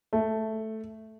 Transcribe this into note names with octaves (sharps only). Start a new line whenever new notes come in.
A3